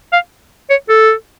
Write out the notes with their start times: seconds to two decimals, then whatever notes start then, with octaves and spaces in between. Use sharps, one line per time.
0.13 F5
0.70 C#5
0.89 A4